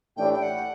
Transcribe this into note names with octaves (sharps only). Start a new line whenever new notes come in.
A2 E3 A3 D4 G4 G5
G5
F#5